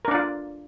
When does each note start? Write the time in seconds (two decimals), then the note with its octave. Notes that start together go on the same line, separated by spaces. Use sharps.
0.05 A#4
0.08 D4
0.11 D5
0.15 F4